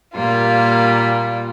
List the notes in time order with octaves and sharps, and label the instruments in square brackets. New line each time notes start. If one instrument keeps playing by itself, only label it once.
[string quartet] A#2 G3 A#3 F4